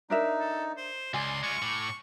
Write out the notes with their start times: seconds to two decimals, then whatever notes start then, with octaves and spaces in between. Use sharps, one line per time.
0.10 D4 D#4 A#4 E5
0.40 A4
0.77 C5
1.14 C#2 D5 G#5 C6
1.43 G#3 F4 C#6
1.62 A2 D6